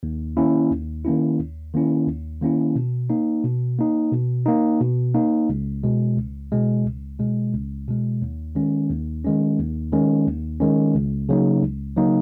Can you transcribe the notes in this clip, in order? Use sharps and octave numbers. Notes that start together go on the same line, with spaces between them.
D#2
D#3 A#3 C#4 E4
D#2
D#3 A#3 C#4 E4
D#2
D#3 A#3 C#4 E4
D#2
D#3 A#3 C#4 E4
B2
A#3 D#4
B2
A#3 D#4
B2
A#3 D#4
B2
A#3 D#4
C#2
B2 G#3
C#2
B2 G#3
C#2
B2 G#3
C#2
B2 G#3
D#2
D#3 G#3 C#4
D#2
D#3 G#3 C#4
D#2
D#3 G#3 C#4
D#2
D#3 G#3 C#4
C#2
C#3 F#3 A#3 D#4
C#2
C#3 F#3 A#3 D#4